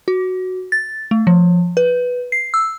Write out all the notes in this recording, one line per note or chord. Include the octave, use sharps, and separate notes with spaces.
F#4
A6
A3
F3
B4
C7
E6